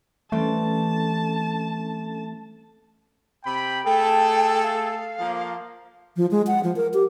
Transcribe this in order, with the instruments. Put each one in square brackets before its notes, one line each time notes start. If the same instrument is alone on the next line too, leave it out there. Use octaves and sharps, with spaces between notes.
[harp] E3 G3 C4 [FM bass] A3 [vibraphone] C#4 A4 [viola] A5
[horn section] C3 G5 B5
[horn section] A3 G#4 A4 [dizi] G5
[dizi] F5
[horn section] F3 A#3
[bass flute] F3
G#3
F#5
F3
A#4
G4